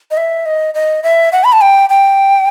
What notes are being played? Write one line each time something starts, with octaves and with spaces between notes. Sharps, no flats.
D#5
E5
D#5
D#5
E5
F#5
B5
A5
G5
G5